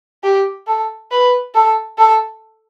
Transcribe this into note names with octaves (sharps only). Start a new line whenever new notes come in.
G4
A4
B4
A4
A4